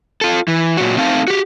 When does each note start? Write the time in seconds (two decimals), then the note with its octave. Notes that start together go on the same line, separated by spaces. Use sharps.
0.21 F4 A4
0.48 E3
0.77 A#2 F#3 F#4
0.97 A3 C4 D#4 F5 G#5 A5
1.28 F#4 G4